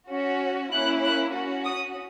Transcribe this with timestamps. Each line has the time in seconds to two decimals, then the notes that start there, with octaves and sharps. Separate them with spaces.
0.11 C#4 F#4
0.72 A#3 C#4 E4 F#6
1.03 F#6
1.34 C#4 F#4
1.65 D#6